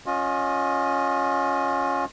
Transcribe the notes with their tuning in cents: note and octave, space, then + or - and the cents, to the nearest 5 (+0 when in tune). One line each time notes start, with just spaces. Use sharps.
C#4 +0 F4 +35 D#5 +0